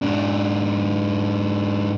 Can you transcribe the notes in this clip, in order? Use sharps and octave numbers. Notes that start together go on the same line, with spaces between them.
G#2 D4